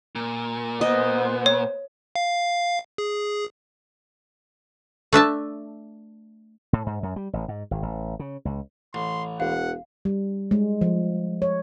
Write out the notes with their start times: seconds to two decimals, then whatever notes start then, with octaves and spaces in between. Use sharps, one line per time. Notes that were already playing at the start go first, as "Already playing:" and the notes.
0.15 A#2
0.81 B3 C5 D#5
1.46 C#5
2.15 F5
2.98 G#4
5.13 A3 D4 E5 A5
6.73 A2
6.86 G#2
7.03 F#2
7.16 G3
7.33 A1
7.48 G#2
7.71 G#1
7.83 A1
8.19 C#3
8.45 C#2
8.94 A1 C6
9.40 E1 F5 F#5
10.05 G3
10.51 G#3
10.81 F3
11.42 C#5